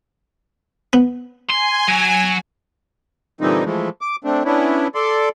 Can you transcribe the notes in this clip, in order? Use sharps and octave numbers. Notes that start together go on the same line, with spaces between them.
B3
G#5 C6
F#3
A#2 D3 E3 G3 C4 D#4
E3 F3 G#3 A3
D6
A3 C4 D4
B3 C#4 D4 E4
A4 D5 C6